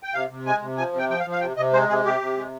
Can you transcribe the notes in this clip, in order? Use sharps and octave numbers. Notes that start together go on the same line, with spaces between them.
G5
C3 F5
C3
G#3 G#5
C3
F3 G#5
C3
G5
F3 G5
F5
F3
F5
C3 G5
C3 D#5
G#3 C5
C3 G#4
C3 G4
C3
G#3